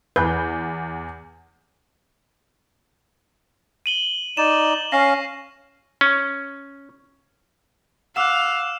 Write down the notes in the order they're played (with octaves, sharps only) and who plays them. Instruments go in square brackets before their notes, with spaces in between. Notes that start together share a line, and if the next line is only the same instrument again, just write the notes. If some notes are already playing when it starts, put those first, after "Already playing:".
[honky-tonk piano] E2 G6 [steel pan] B4
[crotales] D#7 F#7 G7
[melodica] D#4 D5 [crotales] E7
[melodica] C#4 F5 [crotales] A#6 C7
[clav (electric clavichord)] C#4
[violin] F5 [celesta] F#5 D6 F#6 [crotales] E6 E7